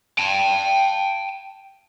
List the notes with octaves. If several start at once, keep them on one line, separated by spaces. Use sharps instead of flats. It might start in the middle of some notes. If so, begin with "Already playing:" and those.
G5 A5